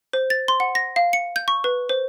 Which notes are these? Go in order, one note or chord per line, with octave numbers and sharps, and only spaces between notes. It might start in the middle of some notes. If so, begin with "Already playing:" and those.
C5
A6
C6
F#5
A#6
F5
C#7
G6
C#6
B4
C5